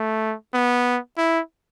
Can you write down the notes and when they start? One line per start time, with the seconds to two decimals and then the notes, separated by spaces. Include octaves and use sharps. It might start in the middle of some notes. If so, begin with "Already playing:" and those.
Already playing: A3
0.54 B3
1.17 E4